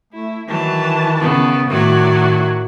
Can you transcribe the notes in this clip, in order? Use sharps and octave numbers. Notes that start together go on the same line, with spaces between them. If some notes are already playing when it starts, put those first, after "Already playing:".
A3 E4
D#3 E3 F#3 A5
C#3 B3
A2 D#3 F#3 F#4 D5